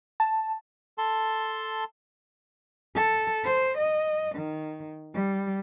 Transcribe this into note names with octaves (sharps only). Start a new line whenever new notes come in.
A5
A4 A5 C6
A4
C5
D#5
D#3
G3